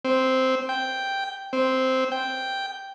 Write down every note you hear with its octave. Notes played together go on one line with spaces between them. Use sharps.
C4
G5
C4
G5